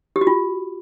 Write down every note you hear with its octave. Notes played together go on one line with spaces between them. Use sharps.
G4
F#4
F4